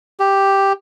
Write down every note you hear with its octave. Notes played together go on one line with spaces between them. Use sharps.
G4